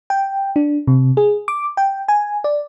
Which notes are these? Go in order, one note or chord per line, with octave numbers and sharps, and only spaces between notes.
G5
D4
C3
G#4
D6
G5
G#5
D5